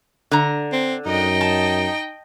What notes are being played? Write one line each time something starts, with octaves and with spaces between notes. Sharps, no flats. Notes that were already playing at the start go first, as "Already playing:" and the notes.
D3 A#5
C4
F#2 D#4 D#5 G5
A5